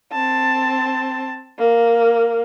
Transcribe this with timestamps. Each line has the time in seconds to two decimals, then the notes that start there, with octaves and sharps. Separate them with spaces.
0.12 C4 A5
1.59 A#3